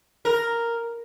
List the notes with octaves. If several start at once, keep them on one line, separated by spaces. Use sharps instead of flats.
A#4